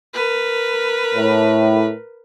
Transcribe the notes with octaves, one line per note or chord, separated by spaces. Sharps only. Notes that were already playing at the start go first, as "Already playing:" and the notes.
A#4 B4
A2